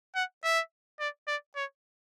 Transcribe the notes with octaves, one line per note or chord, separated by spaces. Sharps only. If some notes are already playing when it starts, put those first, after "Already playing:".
F#5
E5
D5
D5
C#5